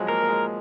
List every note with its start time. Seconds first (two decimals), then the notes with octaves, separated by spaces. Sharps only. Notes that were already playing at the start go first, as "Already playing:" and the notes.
Already playing: F3 F#3 G#3
0.08 A#3 A#4
0.22 A#3
0.29 G#3